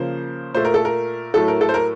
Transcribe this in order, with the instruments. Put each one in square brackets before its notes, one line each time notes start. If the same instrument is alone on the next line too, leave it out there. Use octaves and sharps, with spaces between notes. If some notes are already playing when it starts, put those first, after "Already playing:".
Already playing: [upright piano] C#3 F3 A#3 C5
A#2 A3 C5
A#4
A4
A#4
A2 F#3 A3 A4
A#4
A4
C5
A#4